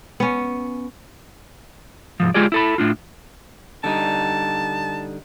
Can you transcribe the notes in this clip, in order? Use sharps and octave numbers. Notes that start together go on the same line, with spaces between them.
B3 C#4
C2 G#2 F3
G#3 F4 G4 G#4 D5
E4 A4 B5
A2 D4 F4
D3 G3 D#4 A5